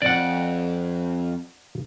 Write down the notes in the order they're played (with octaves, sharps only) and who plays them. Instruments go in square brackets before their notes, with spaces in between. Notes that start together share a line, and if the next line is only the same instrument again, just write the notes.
[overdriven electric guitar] F2 [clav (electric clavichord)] D5 F#5